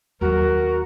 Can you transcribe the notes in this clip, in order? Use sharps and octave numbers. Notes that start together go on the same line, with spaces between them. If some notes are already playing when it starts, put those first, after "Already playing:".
D#2 F#3 F#4 A#4